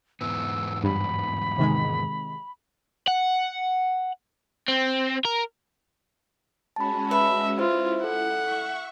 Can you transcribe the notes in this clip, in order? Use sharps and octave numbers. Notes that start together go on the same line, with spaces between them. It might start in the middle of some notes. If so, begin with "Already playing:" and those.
E2 G#2 B3 E6
G2 B5
C3 D#3 G#3
F#5
C4
A#4
G#3 C#4 F#4 A5 B5
B4 E5
E4 F4 C5 E5
A4 F#5
E5 C#6